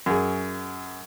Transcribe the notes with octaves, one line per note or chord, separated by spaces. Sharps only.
F#2 G#4